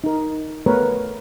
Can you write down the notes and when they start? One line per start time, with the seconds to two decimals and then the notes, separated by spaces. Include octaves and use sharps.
0.04 D#4 A#4
0.66 A3 B3 A#4 B4 C#5